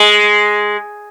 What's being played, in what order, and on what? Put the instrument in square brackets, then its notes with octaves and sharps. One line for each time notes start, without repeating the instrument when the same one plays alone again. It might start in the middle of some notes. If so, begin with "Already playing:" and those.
Already playing: [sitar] G#3